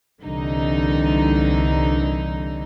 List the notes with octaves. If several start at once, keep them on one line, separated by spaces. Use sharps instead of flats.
C2 D3 E3 D#4